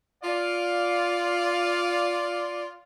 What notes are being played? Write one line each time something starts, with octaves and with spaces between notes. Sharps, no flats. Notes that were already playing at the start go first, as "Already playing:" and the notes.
F4 D5 F5